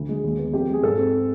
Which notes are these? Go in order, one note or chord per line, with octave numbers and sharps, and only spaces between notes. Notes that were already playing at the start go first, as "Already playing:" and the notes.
Already playing: D2
G#3
D#2
B3
F2 G4
G#3 G#4
G#2 A4
C4